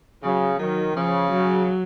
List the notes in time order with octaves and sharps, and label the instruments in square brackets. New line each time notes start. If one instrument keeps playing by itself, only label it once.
[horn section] C#3 [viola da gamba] F#3
[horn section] D#3 [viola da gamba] F#3
[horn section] C#3 [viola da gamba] F3
[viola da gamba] F#3